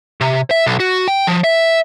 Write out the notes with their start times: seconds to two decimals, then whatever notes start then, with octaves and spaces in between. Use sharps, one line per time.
0.21 C3
0.51 E5
0.67 B1
0.80 F#4
1.08 G5
1.27 F3
1.44 E5